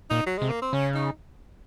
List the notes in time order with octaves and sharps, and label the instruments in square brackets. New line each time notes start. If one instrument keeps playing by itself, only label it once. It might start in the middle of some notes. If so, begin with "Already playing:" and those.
[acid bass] A#2 [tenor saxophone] D#4
[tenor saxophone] F#3
[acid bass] C3 [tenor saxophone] G#3
[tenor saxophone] A#3
C4
[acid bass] C#3 [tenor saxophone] C#4
[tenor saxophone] D#4